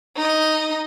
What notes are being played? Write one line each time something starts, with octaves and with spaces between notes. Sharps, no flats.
D#4 D#5